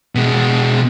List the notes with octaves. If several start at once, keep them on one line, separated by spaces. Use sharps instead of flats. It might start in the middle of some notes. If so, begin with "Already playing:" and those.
B2 G#3